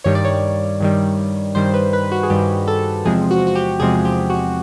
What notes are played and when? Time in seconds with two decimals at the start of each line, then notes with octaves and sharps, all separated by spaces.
0.04 G2 D#3 G3 C#5
0.15 D5
0.24 C#5
0.80 G2 D#3 G3
1.55 G2 D#3 G3 C5
1.74 B4
1.93 B4
2.12 F#4
2.23 G#4
2.30 G2 D#3 G3 G4
2.68 A4
3.05 E2 C3 F3 G#3 C4 G#4
3.31 F#4
3.47 F#4
3.55 G4
3.80 E2 C3 F3 G#3 C4 G#4
4.05 G4
4.30 F#4